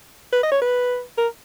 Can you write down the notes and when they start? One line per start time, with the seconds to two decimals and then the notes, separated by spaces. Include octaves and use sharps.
0.32 B4
0.43 D#5
0.52 C#5
0.62 B4
1.17 A#4